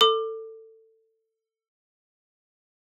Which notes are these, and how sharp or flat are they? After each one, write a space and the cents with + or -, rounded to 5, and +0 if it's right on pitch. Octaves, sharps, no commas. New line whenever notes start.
A4 +20 D6 +20